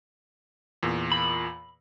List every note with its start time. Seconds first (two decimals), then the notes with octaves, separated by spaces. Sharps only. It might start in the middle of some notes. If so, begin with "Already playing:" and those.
0.83 E2 A#2
1.12 B5